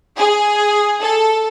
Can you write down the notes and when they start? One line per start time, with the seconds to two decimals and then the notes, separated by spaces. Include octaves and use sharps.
0.17 G#4
1.00 A4